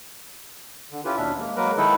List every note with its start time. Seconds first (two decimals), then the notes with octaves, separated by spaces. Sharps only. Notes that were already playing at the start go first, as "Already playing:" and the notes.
0.92 D3
1.05 C#4 E4 F4 G4 B4
1.17 D#2 B2 C#4 D4 E5
1.39 G#3 A#3
1.56 F#3 G#3 A#3 A#4 B4
1.77 D#3 G#3 D#4 E4 A4 B4